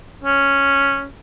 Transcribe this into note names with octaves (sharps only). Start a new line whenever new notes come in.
C#4